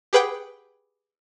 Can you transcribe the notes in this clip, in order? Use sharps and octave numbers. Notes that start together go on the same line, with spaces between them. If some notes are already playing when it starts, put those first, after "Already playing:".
G4 G#4 B4 F#5 G5